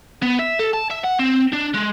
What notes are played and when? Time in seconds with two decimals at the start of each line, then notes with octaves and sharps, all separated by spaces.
0.23 B3
0.39 E5
0.59 A4
0.73 A5
0.90 E5
1.04 F#5
1.19 C4
1.53 D4
1.74 G#3